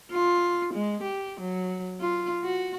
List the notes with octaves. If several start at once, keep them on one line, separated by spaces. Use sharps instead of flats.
F4
G#3
G4
F#3
F4
F#4